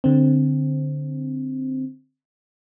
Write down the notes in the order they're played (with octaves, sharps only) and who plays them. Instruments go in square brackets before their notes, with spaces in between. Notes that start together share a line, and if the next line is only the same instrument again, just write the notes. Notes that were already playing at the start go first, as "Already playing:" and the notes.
[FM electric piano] D3 C4